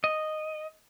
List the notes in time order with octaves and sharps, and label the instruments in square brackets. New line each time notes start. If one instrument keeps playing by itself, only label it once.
[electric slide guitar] D#5